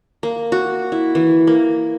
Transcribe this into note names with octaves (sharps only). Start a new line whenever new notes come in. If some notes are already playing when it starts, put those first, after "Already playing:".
A#3
F#4
E4
E3
A#3